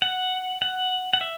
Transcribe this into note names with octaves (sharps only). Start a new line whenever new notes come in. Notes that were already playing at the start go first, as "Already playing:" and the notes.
F#5
F#5
F#5
E5